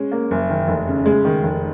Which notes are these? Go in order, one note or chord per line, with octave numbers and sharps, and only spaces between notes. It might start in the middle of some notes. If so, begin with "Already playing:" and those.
Already playing: G#3 C#4
A#3
F#1
D#3
F1
C#3
G#3
D#3
F1